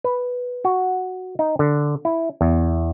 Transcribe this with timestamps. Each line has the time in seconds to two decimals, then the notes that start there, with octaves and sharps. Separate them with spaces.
0.04 B4
0.65 F#4
1.39 D#4
1.59 D3
2.05 E4
2.41 E2